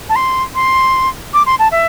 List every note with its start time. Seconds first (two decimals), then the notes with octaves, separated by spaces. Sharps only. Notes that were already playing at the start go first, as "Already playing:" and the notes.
0.09 A5
0.16 C6
0.55 C6
1.34 D6
1.46 C6
1.59 A5
1.71 E5